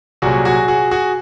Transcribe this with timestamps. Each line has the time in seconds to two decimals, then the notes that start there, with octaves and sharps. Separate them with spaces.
0.22 C2 A#2 F#3 F#4 G#4
0.45 F#4 G#4
0.68 F#4 G#4
0.91 F#4 G#4